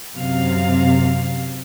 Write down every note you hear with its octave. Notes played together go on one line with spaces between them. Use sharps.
F#2 C3 F5